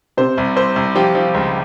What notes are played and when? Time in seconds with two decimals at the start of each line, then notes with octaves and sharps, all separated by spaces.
0.17 C3 C5
0.37 C2
0.56 C2 C5
0.76 C2
0.96 F3 G4
1.15 F3
1.34 C#2